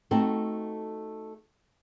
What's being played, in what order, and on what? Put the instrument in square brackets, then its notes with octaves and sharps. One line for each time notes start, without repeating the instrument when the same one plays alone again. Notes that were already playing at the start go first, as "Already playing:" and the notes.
[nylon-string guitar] A3 C4 D#4 F#4 A4